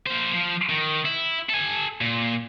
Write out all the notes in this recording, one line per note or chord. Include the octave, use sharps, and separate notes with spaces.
A#3 C5
F3
D#3
E4
A4 G#5
A#2